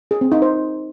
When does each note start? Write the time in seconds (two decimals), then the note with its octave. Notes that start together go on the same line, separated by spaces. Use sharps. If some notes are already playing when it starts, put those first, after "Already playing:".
0.11 G#4
0.21 C4
0.32 D#4
0.42 C5